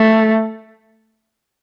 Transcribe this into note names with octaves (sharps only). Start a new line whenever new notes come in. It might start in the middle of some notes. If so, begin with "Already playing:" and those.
Already playing: A3